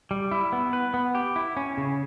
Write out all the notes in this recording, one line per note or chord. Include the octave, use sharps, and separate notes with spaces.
G3
E4
B3
B4
B3
G4
E4
C#4
C#3